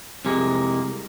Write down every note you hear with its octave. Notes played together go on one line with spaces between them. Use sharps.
C2 F2 C3 G#3 A#3